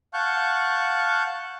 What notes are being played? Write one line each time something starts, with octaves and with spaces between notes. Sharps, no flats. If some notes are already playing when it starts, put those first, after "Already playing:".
F5 F#5 A5 C#6 F#6 G6